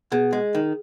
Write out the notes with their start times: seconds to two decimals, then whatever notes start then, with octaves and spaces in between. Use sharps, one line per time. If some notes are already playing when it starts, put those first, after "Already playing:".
0.12 B2 G#4
0.33 G#3
0.55 D#3